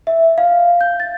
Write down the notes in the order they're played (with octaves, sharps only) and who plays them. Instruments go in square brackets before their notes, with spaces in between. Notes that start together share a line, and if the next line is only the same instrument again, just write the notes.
[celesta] E5
F5
G6
A6